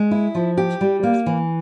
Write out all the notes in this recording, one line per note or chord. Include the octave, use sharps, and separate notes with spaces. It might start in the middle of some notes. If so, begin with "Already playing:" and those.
Already playing: G#3
E4
F3
G4
G3
A#3
E3